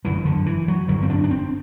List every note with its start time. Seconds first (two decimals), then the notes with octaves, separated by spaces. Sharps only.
0.04 G1 F#2 D3 E3
0.25 D3
0.46 E3
0.68 F#3
0.88 G1 F#2 D3 F#3
1.02 C4
1.10 D4
1.24 D4
1.31 C4